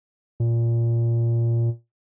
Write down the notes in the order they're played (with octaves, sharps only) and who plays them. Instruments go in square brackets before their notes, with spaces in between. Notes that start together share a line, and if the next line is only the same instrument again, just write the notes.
[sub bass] A#2